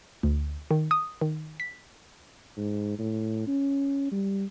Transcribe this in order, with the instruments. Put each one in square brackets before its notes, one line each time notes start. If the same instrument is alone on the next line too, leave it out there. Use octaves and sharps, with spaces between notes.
[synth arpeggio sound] D2
D#3
D#6
D#3
B6
[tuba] G#2
A2
C#4
G3